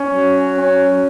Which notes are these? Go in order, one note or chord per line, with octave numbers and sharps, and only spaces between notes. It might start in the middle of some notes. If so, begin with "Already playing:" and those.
Already playing: C#4
F#3
C#4